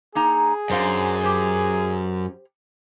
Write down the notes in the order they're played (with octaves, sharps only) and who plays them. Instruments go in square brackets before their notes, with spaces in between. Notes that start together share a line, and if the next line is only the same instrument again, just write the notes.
[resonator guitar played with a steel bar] A#3 D#4 A#5 [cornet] G#4
[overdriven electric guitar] F#2 [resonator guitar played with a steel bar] D4 C5 F5
[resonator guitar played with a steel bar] G4 C5